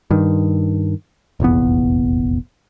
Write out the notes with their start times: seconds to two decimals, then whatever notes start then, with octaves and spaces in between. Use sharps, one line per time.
0.11 G2 D#3
1.40 F1 A#1 E2 B3